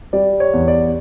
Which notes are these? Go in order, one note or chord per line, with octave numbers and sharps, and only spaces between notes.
G3 D5
C#5
E2
D5